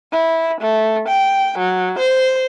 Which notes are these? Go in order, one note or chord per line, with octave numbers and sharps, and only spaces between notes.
E4
A3
G5
F#3
C5